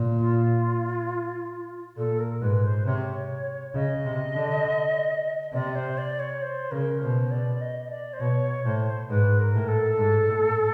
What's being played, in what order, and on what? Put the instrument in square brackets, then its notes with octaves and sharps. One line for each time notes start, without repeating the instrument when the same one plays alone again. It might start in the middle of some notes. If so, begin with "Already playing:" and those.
Already playing: [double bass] A#2
[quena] F4
[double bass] A#2 [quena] A4
[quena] A#4
[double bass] G#2 [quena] B4
[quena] C5
[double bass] C3 [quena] C#5
[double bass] C#3 [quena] D#5
[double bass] C3
D3
[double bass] C3 [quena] D5
[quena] C5
D5
C#5
C5
[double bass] C#3 [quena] A#4
[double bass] B2 [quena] C5
[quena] D5
D#5
D#5
D5
C5
[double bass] B2 [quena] C#5
[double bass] A2 [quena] C5
[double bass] G#2 [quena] B4
[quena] A#4
[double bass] A2
[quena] A4
[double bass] G#2
A2